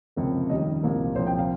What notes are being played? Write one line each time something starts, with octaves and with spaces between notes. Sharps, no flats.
C#2 C3 F3 A#3
D#2 C#3 G3 D#5
C2 A#2 F3 A#3
C2 A#2 F3 C4 C5
G5
F5